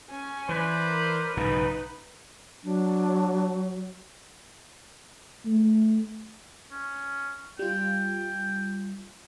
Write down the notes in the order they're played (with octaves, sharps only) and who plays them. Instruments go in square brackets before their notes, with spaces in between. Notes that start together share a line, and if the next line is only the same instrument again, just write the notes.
[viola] C#4 G#5
[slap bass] E3 [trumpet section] B4 C5 D5
[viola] A#4
[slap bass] B1 G#2 C#3 [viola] D#4 B4
[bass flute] F#3 [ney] D4
[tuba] A3
[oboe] C#4
[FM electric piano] G3 F4 [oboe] G5